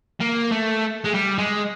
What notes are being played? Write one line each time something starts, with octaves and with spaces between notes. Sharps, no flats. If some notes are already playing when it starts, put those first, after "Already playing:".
A#3
A3
G#3
G3
G#3